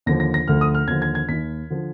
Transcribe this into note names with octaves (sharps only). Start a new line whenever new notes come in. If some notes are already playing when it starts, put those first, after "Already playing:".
D#2 D3 F3 A#6
A#6
A#6
D2 D3 F3 F6
D#6
F6
D#2 D3 F3 G#6
G#6
G#6
D#2 D#3 B6
D3 F3